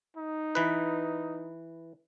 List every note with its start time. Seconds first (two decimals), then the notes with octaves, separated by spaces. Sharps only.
0.16 D#4
0.55 E3 B4